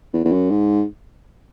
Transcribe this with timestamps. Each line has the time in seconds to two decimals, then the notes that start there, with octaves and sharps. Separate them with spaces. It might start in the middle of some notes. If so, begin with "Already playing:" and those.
0.13 E2
0.24 E2
0.32 F#2
0.50 G#2